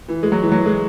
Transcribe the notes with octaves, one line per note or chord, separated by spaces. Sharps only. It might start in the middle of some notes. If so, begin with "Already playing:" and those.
E3
G#3
F#3
E3
F#3
G#3